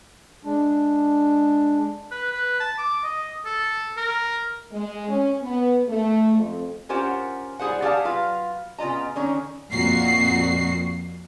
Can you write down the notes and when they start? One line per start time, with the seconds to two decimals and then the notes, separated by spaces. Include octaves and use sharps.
0.45 G#3 D4
2.11 B4
2.31 B4
2.60 A5
2.78 D6
3.04 D#5
3.46 A4
3.97 A#4
4.72 G#3
5.08 C#4
5.42 B3
5.88 A3
6.36 F2
6.89 C#4 F4 G4 A#4 C5 F#5
7.59 G3 E4 G#4 C5 F#5
7.82 G4 G#4 D5 F5 F#5 A5
8.05 F#3 F4 B4 F5
8.78 C#3 B3 F4 D#5 A#5
9.16 D3 D#3 C#4 G#4 A#5
9.71 F2 A#2 F#4 C7